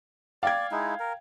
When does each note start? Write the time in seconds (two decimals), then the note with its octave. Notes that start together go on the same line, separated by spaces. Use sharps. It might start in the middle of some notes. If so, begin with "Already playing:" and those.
0.43 D5 F5 G5 G#6
0.72 G#3 D#4 E4
0.99 A#4